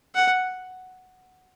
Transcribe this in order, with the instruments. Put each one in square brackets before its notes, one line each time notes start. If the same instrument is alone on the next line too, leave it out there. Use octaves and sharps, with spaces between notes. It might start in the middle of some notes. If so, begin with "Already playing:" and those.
[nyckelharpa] F#5